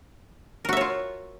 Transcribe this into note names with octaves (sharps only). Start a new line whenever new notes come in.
F4 F#4 A#4 C#5 E5